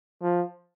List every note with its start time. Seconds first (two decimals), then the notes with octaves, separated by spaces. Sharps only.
0.22 F3